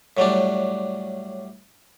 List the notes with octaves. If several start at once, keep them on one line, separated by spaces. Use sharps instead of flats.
A2 F#3 G3 D4